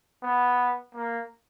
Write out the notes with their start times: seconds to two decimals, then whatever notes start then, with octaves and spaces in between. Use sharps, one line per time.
0.22 B3
0.94 A#3